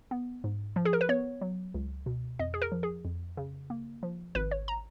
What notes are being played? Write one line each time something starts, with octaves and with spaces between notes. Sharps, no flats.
B3
G#2
F3
G#4
A#4
B4
B3 C#5
F#3
C#2
B2
F2 D#5
G#4
A#4
F3
G#4
F2
C#3
A#3
F3
G#1 B4
C#5
A#5